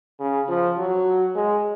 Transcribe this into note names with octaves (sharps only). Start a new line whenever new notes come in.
C#3
F3
F#3
G#3